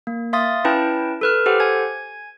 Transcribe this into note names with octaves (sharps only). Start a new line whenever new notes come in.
A#3
E5 F5 C6 D#6 A6
C#4 E4 B4 G5 A5
A4 B4 F6
G4 A4 C5 F#5
G#5 G#6